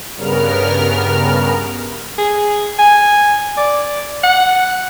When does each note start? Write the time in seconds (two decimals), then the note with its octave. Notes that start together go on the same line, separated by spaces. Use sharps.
0.17 G2 C#3 B3 A#4 F6
2.18 G#4
2.79 G#5
3.57 D5
4.24 F#5